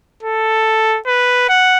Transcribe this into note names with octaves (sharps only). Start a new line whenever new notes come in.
A4
B4
F#5